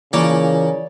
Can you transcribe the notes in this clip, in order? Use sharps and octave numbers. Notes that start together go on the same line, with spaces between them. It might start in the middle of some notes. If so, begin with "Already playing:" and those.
C#3 E3 F3 A#3 C#5 D5